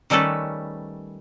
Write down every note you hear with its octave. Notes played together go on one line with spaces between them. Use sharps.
D#3 G3 A3 C#4 A4 B4